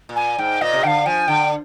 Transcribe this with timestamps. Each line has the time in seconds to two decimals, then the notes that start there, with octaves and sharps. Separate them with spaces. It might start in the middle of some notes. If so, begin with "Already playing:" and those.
0.09 A#2
0.16 G#5
0.38 G#2 G5
0.61 A#2 D#5
0.73 C3
0.83 D3 F5 G5
1.06 F3 G#5
1.28 D3 G5